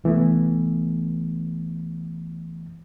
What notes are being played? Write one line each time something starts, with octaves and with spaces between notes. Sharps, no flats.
C2 E3 A3 B3